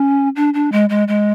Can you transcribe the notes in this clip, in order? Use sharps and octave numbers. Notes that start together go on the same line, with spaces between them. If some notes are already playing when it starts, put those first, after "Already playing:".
Already playing: C#4
D4
D4
G#3
G#3
G#3